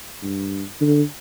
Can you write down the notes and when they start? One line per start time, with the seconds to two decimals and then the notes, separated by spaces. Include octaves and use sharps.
0.23 G2
0.81 D3